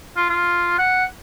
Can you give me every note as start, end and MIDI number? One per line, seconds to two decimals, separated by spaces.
0.16 0.27 65
0.29 0.76 65
0.78 1.05 78